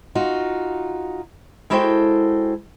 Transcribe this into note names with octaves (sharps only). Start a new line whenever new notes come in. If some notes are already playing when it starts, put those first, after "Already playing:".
D#4 F4 F#4
G#3 E4 F#4 A4 C5 G5